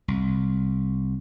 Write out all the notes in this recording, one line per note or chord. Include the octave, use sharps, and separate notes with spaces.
C2